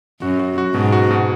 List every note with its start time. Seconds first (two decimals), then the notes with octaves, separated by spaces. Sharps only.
0.22 F#2 F#4
0.39 F#4
0.58 F#4
0.74 G#2 B2
0.92 F#4
1.11 B2